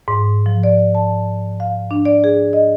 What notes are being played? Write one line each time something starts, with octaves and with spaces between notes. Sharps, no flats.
G#2
F3
D5
A5
F5
D4
D5
G#4
D#5